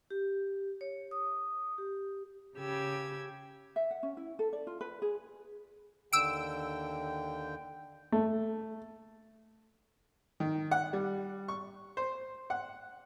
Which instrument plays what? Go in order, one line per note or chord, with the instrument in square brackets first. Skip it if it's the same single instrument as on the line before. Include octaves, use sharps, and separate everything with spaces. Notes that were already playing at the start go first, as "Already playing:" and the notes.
[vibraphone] G4
C#5
D#6
G4
[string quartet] C#3 G4 E6 G#6
[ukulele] E5
F#5
C#4
E4
A4
D5
F4
B4
G#4
[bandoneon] D#2 D3 G5 [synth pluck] E6 D7
[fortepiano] A3
D#3
F#5
G3
C#6
C5
F#5